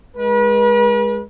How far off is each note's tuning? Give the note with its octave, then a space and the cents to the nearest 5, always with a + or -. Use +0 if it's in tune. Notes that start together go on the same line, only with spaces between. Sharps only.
G#3 +0 B4 -40